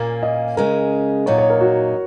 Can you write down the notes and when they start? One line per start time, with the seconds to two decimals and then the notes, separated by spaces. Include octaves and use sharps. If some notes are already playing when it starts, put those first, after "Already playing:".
Already playing: A#2 A#3 C#4 A#4
0.22 D#5
0.57 C#3 G#3 C#4 A#4
1.26 A#2 F#3 D#4 C#5
1.38 C#5
1.50 A#4
1.61 F#4